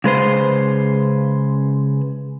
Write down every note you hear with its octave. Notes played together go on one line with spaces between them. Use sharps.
C#3 G#3 B4 C5